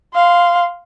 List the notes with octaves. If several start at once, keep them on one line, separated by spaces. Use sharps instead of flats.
F5 C6